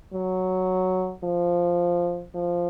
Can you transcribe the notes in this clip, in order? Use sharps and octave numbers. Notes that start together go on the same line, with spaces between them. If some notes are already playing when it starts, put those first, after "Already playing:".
F#3
F3
F3